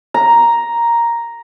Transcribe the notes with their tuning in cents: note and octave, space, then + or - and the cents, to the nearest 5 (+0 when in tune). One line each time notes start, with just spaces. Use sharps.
A#5 +5